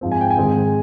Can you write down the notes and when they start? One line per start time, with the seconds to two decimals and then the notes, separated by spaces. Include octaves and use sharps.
0.01 G#2 F3 C4
0.12 G#5
0.21 G5
0.30 G#5
0.37 G#2 D#3 G#3 C4